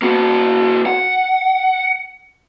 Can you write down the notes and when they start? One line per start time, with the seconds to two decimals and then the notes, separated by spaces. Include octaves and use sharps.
0.02 A#3 F#4
0.86 F#5